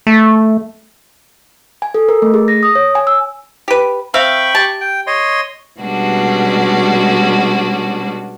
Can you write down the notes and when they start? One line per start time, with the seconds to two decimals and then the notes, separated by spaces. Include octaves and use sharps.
0.07 A3
1.82 G#5
1.94 A4
2.09 A#4
2.22 A3
2.34 G#4
2.48 A#6
2.63 D#6
2.75 C#5
2.95 G#5
3.07 E6
3.68 G4 B4
4.14 C4 E5 F5 G5 B5 C#6
4.55 G4 A5
4.81 G5
5.07 C#5 D#5 C6
5.80 B2 G3 G#3 C#4 D4 F#4